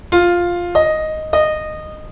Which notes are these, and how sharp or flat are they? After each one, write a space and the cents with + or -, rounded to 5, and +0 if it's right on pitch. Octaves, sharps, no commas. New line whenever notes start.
F4 +5
D#5 +0
D#5 -15